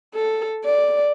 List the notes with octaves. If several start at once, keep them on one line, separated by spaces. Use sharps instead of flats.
A4
D5